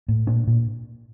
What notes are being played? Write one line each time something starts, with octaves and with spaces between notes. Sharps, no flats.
A2
A#2 D4
A#2